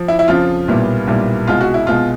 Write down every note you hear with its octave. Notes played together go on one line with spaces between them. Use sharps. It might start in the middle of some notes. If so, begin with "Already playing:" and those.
Already playing: F3
E4
E4
F2 C#3 F3 F4
B1 A#2 G3 B3 E4
B1 A#2 G3 B3 E4
C2 B2 G#3 F4
F#4
E4
C2 B2 G#3 F4